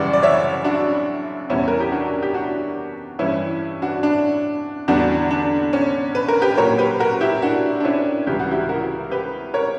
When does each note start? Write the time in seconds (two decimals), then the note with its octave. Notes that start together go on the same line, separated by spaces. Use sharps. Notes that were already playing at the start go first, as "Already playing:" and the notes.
Already playing: F#2 C#3 E3 G3 D5 F#5
0.13 D5
0.23 C#5 E5
0.64 D4 F#4
1.50 E2 B2 G3 C#4 E4
1.68 A#4
1.80 G4
1.92 D4 F#4
2.22 G4
2.34 D4 F#4
3.19 G2 E3 G3 C#4 E4
3.82 D4 F#4
4.03 D4
4.88 E2 D3 G3 D4 F#4
5.31 D4
5.73 C#4
6.15 B4
6.28 A#4
6.42 G4 B4
6.57 A#2 F#3 A#4 C#5
6.78 G4 B4
6.99 F#4 A#4
7.21 E4 G4
7.42 D4 F#4
7.80 D4
7.85 C#4 E4
8.27 C#2 C#3 E3 G3 G4
8.39 F#4
8.51 E4 G4
8.69 F#4 A#4
9.11 G4 B4
9.54 A#4 C#5